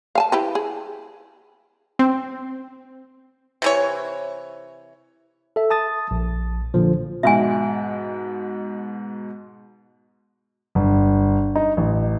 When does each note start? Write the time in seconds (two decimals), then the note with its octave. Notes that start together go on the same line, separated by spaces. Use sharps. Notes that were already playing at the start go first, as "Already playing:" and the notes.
0.15 F5 G#5 A5
0.32 E4 G4 B4
0.55 G#4
1.99 C4
3.62 C3 E3 C#5
5.56 A4 E5
5.70 A5 D#6 A6
6.11 A#1
6.74 A#2 D3 F3
7.23 G#2 B2 E5 G#5
10.75 G1
11.56 D#4
11.77 A1